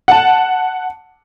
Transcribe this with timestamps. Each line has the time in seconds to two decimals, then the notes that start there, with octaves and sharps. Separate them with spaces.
0.08 F#5 A5